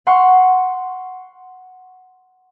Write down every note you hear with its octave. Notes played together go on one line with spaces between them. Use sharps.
F#5 C6 C#6 F6